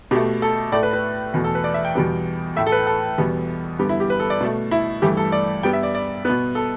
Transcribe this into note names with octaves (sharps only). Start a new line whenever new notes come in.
B2 A3 G4
A4
A2 A3 D5
B4
B4
E2 B2 A3
A4
B4
D5
E5
G5
E2 B2 G3 B3
A2 A3 E5
A4
B4
A4
E2 B2 G3 B3
G2 D3 B3 G4
E4
G4
B4
A4
D5
B2 A3
E4
G2 E3 A3 G4
A4
D5
G2 G3 B3 G5
E5
D5
D5
B2 B3 B4
A4